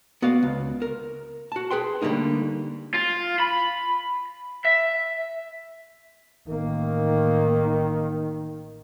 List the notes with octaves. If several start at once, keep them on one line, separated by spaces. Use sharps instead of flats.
B3 F#4 D5 F5
C#2
A#4
F#4 A5
G#4 B4 G5 C6
D3 G3 A3 A#3 D#4
F4
B5
E5
A1 D#3 A#3